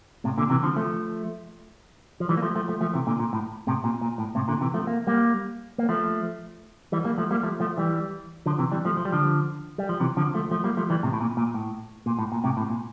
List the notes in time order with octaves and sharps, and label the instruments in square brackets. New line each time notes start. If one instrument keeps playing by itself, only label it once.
[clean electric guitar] A2 C3
A#2 D3
C3 E3
D3 F3
F3 A3
F3
E3 G3
A#3
F3 A3
F3 A3
F3 A3
F3 A3
C3 E3
A#2 D3
A#2
A2
A2 C3
A#2
A#2
A2
A2 C3
A#2 D3
C3 E3
F3 A3
A#3
G3 A#3
A#3
F3 A3
E3 G3
G3 A#3
F3 A3
G3 A#3
F3 A3
F3 A3
E3 G3
D3 F3
C3 E3
E3 G3
F3 A3
F3
G3
D3 F3
G3
F3
C3 E3
D3 F3
F3 A3
F3 A3
G3 A#3
F3 A3
E3 G3
A2 C3
A2
A#2
A#2
A2
A#2
A2
A#2
A2 C3
A2
A#2